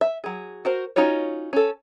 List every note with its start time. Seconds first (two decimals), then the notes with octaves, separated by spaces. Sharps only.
0.01 E5
0.24 F#3 G#4
0.65 F#4 A#4 C5
0.96 C#4 D#4 F4 F#4 C#5
1.53 C#4 A4